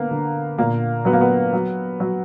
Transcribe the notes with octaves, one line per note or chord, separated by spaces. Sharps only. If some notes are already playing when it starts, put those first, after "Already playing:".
Already playing: D3 A#3 B3
D3
A#2 A#3
F#3 B3
A#3
B3
F#3
F#3